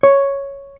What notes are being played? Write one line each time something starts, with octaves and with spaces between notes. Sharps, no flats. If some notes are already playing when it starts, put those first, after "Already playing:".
C#5